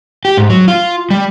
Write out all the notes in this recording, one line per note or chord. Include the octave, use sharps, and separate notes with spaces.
G4
G#2
F#3
F4
G3